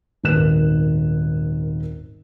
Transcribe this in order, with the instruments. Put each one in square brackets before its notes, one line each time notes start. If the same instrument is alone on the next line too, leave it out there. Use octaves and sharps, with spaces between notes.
[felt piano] D#1 G#1 A#4 B4 F#6 E7